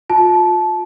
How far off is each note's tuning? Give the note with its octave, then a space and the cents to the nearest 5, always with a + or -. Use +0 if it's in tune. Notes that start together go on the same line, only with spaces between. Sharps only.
F4 +30 A5 -20